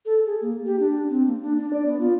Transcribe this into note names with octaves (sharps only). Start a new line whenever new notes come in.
A4
G#4
A#3
G4
D4
C4
A#3
D4
D4
D5
B3
F4